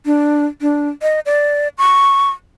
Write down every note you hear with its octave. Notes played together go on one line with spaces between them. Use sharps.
D4
D4
D#5
D5
C#6